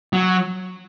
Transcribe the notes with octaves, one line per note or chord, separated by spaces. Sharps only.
F#3